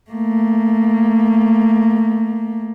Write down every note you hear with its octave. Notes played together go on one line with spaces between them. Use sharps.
A3 A#3